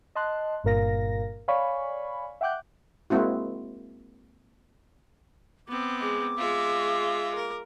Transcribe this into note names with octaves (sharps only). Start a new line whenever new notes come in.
D#5 A5 C6 F#6
G1 G2 A#2 A#4 F5 A#6
C#5 D5 F5 G#5 B5 C#6
E5 F#5 G5 D6 F#6 G6
G#3 A#3 C4 E4 F#4
B3 C4 D6
G#3 D6
G#3 F4 E5
A#4